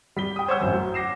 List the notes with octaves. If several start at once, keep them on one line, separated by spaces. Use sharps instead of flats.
G3 B6 G7
G5 D#6
C5 C#5 F#5 C#6 E6 G6
A1 F#2
F#3
F#5 D6 A#6 C7 E7